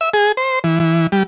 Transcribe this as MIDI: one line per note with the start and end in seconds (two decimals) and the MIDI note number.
0.01 0.09 76
0.14 0.32 68
0.37 0.59 72
0.64 0.79 52
0.80 1.07 52
1.12 1.23 55